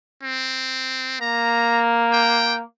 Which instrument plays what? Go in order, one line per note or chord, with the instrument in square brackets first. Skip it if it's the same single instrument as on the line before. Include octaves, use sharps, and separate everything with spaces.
[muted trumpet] C4
[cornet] A#3 [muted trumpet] A#5
[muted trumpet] G5